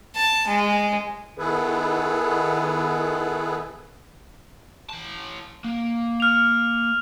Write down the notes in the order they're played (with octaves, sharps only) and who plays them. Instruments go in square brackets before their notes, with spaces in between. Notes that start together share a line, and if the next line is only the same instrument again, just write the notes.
[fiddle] A5
G#3
[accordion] D#3 B3 E4 G#4 A4 B4
[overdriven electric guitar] E3 A5
A#3
[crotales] F6 F7